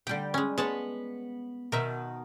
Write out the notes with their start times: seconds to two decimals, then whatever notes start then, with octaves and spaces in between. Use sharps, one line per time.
0.07 D3 G3 G4 G5
0.34 G#3 C#4
0.58 G#3 B3 C#5 A5
1.72 B2 D#3 A#4 E5